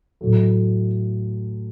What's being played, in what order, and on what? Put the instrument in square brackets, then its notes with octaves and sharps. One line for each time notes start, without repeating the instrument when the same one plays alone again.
[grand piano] A2 F#3 A3